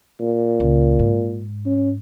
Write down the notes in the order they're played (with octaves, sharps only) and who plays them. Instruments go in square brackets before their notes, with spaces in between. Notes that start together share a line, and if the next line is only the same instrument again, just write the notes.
[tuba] A#2
[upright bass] C#2
G#2
[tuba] C#4